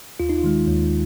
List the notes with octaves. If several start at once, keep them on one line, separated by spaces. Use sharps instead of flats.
D#2 F4
D#4
F4
D#3 G#3
D#2